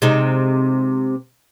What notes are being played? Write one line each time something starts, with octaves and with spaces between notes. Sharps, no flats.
C3 G#3 D#4